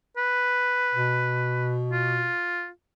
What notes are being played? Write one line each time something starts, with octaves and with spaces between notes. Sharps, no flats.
B4
B2
F4